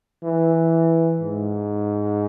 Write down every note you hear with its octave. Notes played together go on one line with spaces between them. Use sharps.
E3
G#2